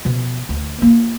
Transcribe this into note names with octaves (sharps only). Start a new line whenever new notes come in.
B2 F3
D2
A#3 F4